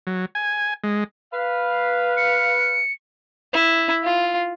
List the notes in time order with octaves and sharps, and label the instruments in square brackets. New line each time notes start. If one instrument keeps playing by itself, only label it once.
[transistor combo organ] F#3
G#5
G#3
[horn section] B4 F5
[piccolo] C#7
[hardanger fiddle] E4
F4